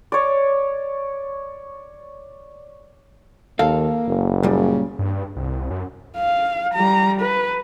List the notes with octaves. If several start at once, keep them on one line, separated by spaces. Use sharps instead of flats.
C#5 D5
D#2 A#3 A4 F5
F#1
A#2 C#3 G3
G2
C2
F#2
F5
G3 A#5
B4